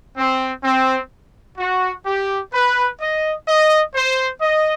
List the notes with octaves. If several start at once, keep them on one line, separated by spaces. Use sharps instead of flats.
C4
C4
F#4
G4
B4
D#5
D#5
C5
D#5